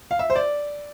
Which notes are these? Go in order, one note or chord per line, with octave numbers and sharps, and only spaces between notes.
F5
E5
C5
D5